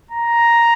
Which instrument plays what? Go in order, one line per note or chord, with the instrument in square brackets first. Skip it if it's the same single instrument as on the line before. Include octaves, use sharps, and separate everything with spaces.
[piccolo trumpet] A#5